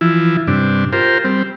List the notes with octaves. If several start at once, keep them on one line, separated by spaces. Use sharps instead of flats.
E3 F3 E4
G2 C3 D4
F4 G4 A#4 C5
G3 C4